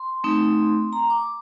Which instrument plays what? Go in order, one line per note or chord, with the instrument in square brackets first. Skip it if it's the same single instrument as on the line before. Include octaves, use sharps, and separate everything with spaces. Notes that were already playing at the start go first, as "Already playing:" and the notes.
Already playing: [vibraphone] C6
A3 C4 D#4
A#5
D6